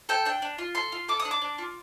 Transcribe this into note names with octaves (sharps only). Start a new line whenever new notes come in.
A4 G5
D4 G5
D4
F4
A4 C6
F4
A4 D6
D#6
D4
D6
D4
F4